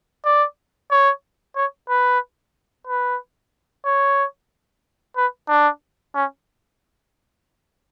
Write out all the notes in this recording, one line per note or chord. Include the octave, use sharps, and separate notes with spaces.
D5
C#5
C#5
B4
B4
C#5
B4
D4
C#4